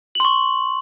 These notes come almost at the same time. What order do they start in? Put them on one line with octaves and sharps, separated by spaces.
F#7 C6 C#6